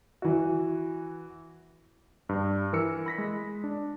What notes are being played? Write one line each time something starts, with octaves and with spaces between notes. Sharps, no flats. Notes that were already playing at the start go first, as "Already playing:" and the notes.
E3 F#4
G2
E3 A#4 E6 C#7
B5 A#6 B6
G#3
D4